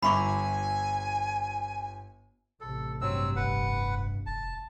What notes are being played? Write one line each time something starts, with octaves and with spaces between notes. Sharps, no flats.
G1 E5 G#5 A#5 B5 C#6 D6
A1 C3 A4
G2 F#3 C4 E6
F1 B4 F#5
F1 A5